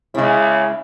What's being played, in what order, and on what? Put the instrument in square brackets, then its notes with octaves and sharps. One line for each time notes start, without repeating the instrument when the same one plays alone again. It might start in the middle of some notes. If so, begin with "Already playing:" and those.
[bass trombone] C#3 [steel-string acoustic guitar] G#3 E4